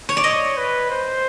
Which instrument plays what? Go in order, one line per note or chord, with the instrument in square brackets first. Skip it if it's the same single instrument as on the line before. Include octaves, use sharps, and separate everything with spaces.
[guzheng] C#5
D5
[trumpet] C#5 [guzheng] D#5
[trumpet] B4
C5